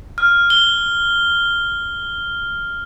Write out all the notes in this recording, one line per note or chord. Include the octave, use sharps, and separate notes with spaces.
F6
G7